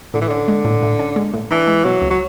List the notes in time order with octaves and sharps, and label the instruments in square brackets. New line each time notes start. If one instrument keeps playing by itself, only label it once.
[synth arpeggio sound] A2 [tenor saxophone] D3
[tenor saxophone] E3
[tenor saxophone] D3 [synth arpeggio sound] C#4
[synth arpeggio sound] G#3
A2
A2
C#4
G#3
A2
[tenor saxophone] E3 [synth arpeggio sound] D4
[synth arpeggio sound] G#3
[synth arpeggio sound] B2 [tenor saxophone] F#3
[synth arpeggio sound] C#2
[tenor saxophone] F#3